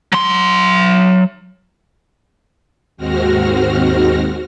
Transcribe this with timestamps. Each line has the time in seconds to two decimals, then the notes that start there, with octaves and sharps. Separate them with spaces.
0.12 F#3 C6
2.97 D#2 G#2 C4 F#4 F6 A#6